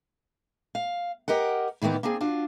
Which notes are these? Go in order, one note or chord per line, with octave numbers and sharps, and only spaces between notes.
F5
G4 A#4 D#5 F#5
A2 D#3 E3 A#3 B3
A#3 C4 D4 G#4
D4 F4 F#4